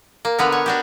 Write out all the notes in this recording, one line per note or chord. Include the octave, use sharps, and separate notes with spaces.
A#3
D3 B3 A#4
C#5
D4 F#4 G4